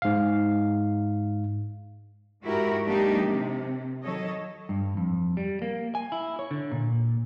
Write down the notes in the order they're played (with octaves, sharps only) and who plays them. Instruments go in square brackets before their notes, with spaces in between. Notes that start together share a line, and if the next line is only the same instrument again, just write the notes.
[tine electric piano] G#2 F5
[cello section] G#2 E4 F#4 G4 A#4
F#3 G#3 A#3 D4 D#4 G4
C3
D#3 F#3 A4 C#5 D#5
[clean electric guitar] G2
F2
G3
A#3
G#5
E4
C#5
D3
A#2